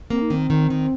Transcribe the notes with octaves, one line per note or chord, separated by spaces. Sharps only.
A#3 C4
D#4
D#3 C4
D#3
D#3